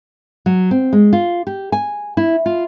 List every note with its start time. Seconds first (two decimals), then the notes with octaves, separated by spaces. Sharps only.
0.46 F#3
0.71 C4
0.93 G#3
1.13 F4
1.47 G4
1.72 G#5
2.17 E4
2.46 F4